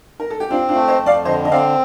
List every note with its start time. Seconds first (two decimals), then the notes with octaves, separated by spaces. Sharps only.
0.20 A#4
0.30 A4
0.40 G4
0.50 C4 D4 F4
0.69 D4 F4
0.75 A3
0.88 C5 D#5
1.01 F2
1.06 D5 F5
1.25 D3 C5 D#5
1.45 D#5
1.51 C4 D5 F5